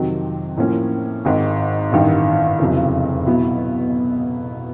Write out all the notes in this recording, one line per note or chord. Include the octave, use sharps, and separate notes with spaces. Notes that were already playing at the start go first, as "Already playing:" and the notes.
Already playing: F2 C3 D#3 F#3
A2 F3 A#3 C#4
G#1 G#2 D#3
A1 G2 D#3
F1 E2 C#3 F#3
B2 F#3 B3 E4